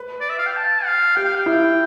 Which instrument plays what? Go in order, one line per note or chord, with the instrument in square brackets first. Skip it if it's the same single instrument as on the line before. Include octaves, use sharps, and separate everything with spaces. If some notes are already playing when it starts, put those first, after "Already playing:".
Already playing: [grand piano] B4
[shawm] D5
E5
F5
G5
A5
F5
[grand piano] G4 [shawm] G5
[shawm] F5
G5
[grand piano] E4